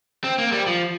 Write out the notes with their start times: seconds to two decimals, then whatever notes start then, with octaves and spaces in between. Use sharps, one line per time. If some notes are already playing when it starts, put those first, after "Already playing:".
0.24 C4
0.39 A#3
0.52 G3
0.67 F3